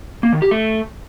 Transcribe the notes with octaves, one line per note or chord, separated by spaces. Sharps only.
A#3
D#3
G4
A3